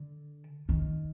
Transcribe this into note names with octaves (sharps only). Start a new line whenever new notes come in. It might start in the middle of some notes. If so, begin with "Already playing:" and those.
Already playing: D3
D#3